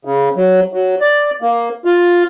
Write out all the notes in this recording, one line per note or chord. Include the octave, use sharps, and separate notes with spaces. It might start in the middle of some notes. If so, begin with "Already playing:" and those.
C#3
F#3
F#3
D5
A#3
F4